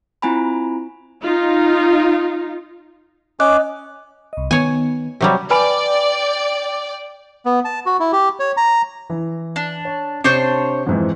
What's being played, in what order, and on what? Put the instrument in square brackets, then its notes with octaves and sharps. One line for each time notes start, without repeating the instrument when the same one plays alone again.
[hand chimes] C4 E4 F4 G#5 A#5 B5
[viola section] D#4 F4
[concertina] C#4 D6 [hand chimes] D#5 F#6
[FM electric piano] C2 D#5
[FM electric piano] D#3 B3 [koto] C#5 G#5
[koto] C3 F#3 G3
[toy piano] B4 G#5 B5 [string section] D5 G5
[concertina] B3
A5
F#4
E4
G4
C#5
A#5
[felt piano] E3
[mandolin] D4
[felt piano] C#5
[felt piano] C3 [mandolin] D4 C5 C#5
[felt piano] F2 G#2 E3